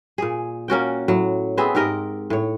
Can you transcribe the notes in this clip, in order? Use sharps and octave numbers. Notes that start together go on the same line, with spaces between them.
A#2 G#4
A#3 C#4 F#4 G5
A2 F#3
B3 C4 G#4 E5
G#2 G4 A#4 D#5
A2 C#5